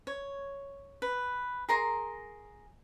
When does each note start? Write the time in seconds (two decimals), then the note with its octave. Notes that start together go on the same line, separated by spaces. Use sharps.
0.07 C#5
1.02 B4
1.69 G#4 A#4 A#5 C6